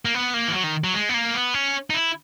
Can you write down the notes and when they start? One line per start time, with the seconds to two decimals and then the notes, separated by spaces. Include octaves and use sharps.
0.05 A#3
0.15 B3
0.34 A#3
0.48 E3
0.54 F#3
0.64 D#3
0.84 F#3
0.94 G#3
1.09 B3
1.14 A#3
1.34 B3
1.54 C#4
1.90 D#4
1.94 E4